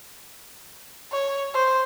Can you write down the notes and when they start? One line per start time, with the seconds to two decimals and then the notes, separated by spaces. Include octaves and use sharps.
1.12 C#5
1.54 C5